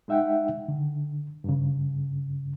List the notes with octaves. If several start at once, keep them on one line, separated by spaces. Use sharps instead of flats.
G#3 D#4 E5 F#5 G5
D3
G2 C#3